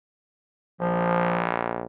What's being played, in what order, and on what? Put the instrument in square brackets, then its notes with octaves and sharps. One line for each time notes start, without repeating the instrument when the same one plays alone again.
[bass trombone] A#1 [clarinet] F3